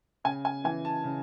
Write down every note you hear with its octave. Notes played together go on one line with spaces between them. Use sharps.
C#3 G#5
G#5
E3 G#5
A5
C#3